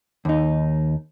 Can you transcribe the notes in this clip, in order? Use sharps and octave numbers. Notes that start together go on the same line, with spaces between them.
D#2 D#4